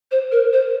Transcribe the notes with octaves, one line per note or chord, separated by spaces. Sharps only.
C5
A#4
C5